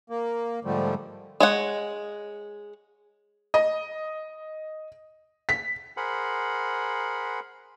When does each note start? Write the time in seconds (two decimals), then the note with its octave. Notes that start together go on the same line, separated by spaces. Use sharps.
0.10 A#3
0.65 G#2 D3 F3 G3 A3
1.40 G#3 C#5 F#5
3.54 D#5
5.49 B6
5.97 G#4 A#4 C5 F#5 B5